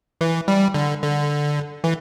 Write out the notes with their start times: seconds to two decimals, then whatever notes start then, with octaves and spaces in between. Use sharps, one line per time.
0.21 E3
0.48 G3
0.74 D3
1.03 D3
1.84 E3